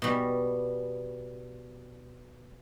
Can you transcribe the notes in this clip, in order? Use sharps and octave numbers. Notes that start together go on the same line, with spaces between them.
B2 G3